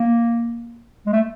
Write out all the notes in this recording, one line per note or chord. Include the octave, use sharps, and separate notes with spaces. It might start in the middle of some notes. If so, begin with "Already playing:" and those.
Already playing: A#3
G#3
A3